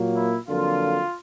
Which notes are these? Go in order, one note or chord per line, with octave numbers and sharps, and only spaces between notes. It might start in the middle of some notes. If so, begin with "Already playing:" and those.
Already playing: A#2 F#3 A#3
E4
F2 D3 F#3 A#3 F4